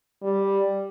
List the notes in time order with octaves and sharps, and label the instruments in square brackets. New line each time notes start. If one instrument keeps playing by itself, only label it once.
[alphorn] G3